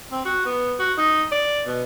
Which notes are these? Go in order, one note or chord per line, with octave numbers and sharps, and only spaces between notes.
C4
F#4
B3
F#4
D#4
D5
B2